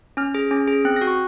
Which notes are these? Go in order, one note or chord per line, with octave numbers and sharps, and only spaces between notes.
C#4 F6
G#4
C#4
G#4
C4 F#6
A#6
F#4
C#6